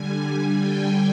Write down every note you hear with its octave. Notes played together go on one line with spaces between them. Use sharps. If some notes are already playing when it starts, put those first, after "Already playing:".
Already playing: D3 G3 G#5
G#5
G5